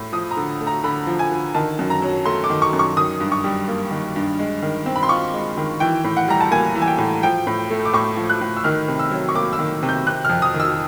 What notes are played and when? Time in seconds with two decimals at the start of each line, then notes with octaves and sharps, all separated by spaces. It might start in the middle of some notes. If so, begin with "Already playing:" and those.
Already playing: A2
0.13 F3 D#6
0.31 A#5
0.37 D3
0.61 A3
0.67 A#5
0.84 D3 B5
1.07 F3
1.19 G#5
1.31 D3
1.55 D#3 A5
1.79 F#2
1.90 A#5
2.02 F#3
2.26 A3 C6
2.44 D6
2.50 D#3
2.62 C#6
2.73 F#2
2.79 C#6
2.97 D#3 D#6
3.20 G2
3.32 C#6
3.44 G3
3.68 A#3
3.91 D#3
4.16 G2
4.39 G#3
4.63 D#3
4.86 C4
4.96 B5
5.03 C6
5.09 F4 C#6
5.34 G#3
5.58 D#3
5.80 E3 G5
6.04 A2
6.17 F#5
6.28 G3 A#5
6.41 A5
6.51 A#3 G#5
6.75 E3
6.82 G#5
6.88 G5
6.98 A2
7.23 F3 G5
7.47 A2
7.70 A3
7.85 D6
7.93 A2 C#6
8.17 F3
8.30 F#6
8.41 A2
8.57 E6
8.64 D#3 F6
8.88 C3
8.99 E6
9.11 F#3
9.29 C#6
9.36 A#3 D6
9.53 E6
9.59 D#3
9.83 C3
9.89 G6
10.07 C3 F#6
10.25 F2 F6
10.42 D#6
10.54 D#3
10.60 E6